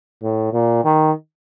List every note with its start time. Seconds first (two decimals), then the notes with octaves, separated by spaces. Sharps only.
0.23 A2
0.53 A#2
0.85 D#3